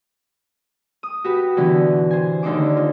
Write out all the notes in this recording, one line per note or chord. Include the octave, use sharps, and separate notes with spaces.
D#6
F#4 G4 B4
B2 D3 E3
C5 G#5
D#2 D3 D#4 C5 D6
F4